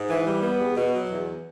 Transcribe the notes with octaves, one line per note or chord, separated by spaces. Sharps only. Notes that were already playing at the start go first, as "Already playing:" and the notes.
Already playing: G#2
E3
G3
B3
E2
B2
F#3
E2